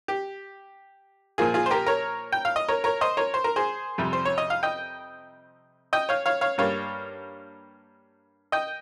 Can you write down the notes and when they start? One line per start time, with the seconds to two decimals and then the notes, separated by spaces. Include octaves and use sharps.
0.08 G4
1.38 A#2 F3 A#3 F4 G#4
1.54 F4 G#4
1.66 C5
1.70 G4 A#4
1.86 A#4 C#5
2.32 G5
2.45 F5
2.56 D#5
2.68 A#4 C#5
2.84 A#4 C#5
3.01 C5 D#5
3.17 A#4 C#5
3.34 C5
3.44 A#4
3.56 G#4 C5
3.98 F2 C3 G3
4.13 C5
4.25 C#5
4.38 D#5
4.50 F5
4.63 D#5 G5
5.93 D#5 G5
6.09 C#5 F5
6.26 C#5 F5
6.41 C#5 F5
6.58 G2 G3 A#3 C#5 F5
8.52 D#5 G5